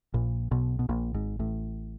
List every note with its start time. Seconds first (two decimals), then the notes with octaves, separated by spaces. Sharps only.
0.14 A#1 A#2
0.51 B1 B2
0.79 B2
0.89 A#1 A#2
1.14 G#1 G#2
1.39 A1 A2